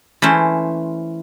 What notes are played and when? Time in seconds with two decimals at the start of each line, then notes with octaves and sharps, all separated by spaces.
0.22 E3 A3 C#4 C5